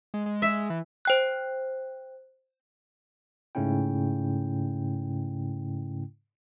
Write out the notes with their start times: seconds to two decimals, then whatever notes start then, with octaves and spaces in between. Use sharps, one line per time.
0.14 G#3
0.26 G#3
0.42 E5
0.70 E3
1.05 C5 G5 F#6
3.55 G#2 C#3 A3 C#4 E4 G5